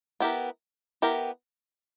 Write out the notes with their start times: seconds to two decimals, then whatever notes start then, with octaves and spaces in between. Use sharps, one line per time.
0.20 B3 E4 G4 A#4
1.02 B3 E4 G4 A#4